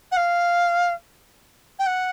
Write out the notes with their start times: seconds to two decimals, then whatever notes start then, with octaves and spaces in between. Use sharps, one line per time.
0.11 F#5
0.16 F5
1.78 G5
1.86 F#5